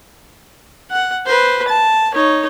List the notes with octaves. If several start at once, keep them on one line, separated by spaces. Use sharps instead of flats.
F#5
B4 C5
A5
D#4 C#5